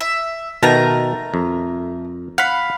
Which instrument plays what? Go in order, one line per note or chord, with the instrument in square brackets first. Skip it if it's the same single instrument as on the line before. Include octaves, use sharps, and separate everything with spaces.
[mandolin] E5
[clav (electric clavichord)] B2 D#3 A5 [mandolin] A3 A#4 A#5
[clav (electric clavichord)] F2
[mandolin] F5 B5 [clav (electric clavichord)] F#5